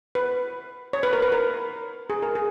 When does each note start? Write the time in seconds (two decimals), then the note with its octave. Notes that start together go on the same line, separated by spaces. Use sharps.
0.15 B4
0.93 C#5
1.03 B4
1.13 A#4
1.22 B4
1.32 A#4
2.10 G#4
2.23 A#4
2.35 G#4